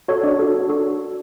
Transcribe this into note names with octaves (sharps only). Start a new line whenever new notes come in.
F#4 A4 C#5
D4 D5
F#4 A4
D4
F#4 A4